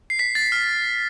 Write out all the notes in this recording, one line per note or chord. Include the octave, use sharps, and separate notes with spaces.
C7
B6
A6
F6